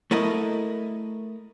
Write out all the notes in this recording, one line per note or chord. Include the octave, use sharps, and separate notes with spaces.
A3 E4 A#4 D#5